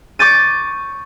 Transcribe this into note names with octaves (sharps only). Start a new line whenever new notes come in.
C#6 D6 G6 A6 D#7